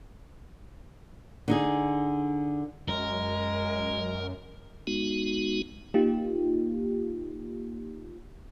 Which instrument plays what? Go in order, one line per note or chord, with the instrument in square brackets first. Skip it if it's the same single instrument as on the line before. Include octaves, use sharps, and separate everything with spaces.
[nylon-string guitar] D3 D#4 G#4
[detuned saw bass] F#2 [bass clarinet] G#3 [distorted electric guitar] A#4
[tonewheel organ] G#3 B3 D#4 F#4
[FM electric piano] A#3 D#4 F4 G4